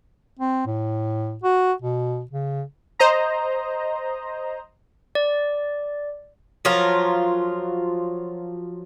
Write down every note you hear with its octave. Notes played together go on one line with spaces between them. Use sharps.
C4
A2
F#4
B2
C#3
C5 D#5 A#5
D5
F3 F#3 F4 A#4